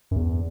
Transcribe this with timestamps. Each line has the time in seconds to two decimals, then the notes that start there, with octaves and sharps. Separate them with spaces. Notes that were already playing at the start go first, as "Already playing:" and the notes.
0.11 F#2
0.16 E2